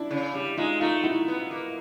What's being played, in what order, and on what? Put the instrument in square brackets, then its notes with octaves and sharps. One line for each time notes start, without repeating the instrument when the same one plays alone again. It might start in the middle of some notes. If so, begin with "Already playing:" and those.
Already playing: [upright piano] D4 E4
[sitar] C#3
G3
[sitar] G#3 [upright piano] D#4 F4
[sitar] A3 [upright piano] D#4 F4
[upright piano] E4 F#4
[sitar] B3
A#3